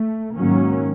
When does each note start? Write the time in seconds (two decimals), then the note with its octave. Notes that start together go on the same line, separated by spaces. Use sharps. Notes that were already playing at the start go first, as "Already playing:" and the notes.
Already playing: A3
0.35 G#2 D#3 F#3 A#3 C#4